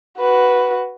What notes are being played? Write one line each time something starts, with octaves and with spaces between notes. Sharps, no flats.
F#4 B4